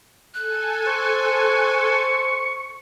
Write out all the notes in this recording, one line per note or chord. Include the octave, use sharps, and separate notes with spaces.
A4 G#5 F#6
C5 C#6